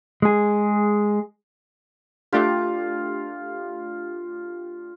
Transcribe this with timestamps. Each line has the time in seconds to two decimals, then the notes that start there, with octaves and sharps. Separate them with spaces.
0.22 G#3 G#4
2.33 A3 D4 F4 G4